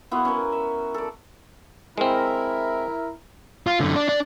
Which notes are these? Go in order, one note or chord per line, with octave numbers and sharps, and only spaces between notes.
B3 E4 F#4 C6
C#4 A#4
E5
A4 D5
G#3 C4 E4 A#4
F4
F#2 D3
D4
D4